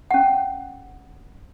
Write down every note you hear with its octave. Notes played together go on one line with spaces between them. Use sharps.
C#4 F#5